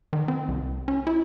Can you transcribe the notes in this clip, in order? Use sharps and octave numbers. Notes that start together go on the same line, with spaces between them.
D#3
C4
C2
C#4
E4